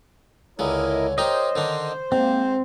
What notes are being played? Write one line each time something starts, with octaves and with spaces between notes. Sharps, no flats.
C#2 D3 G#3 E4 A#4 C#5 D#5
D#4 G4 A#4 C5 D#5
D3 D#3 D4
G#2 A#3 C4